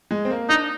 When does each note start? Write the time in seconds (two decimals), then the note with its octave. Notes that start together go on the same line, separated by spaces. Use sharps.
0.11 G#3
0.25 C4
0.31 A#3
0.49 D4 D#4